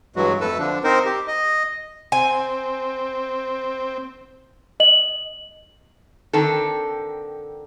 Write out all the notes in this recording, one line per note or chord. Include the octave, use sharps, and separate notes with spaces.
G2 E3 F#3 G#3 F#4
F2 A3 A4 B4 E6
D3 F3 D4
C4 D#4 A#4 C5
G4
D#5
C4 G#5
D#5 F#7
D3 D#3 C4 A4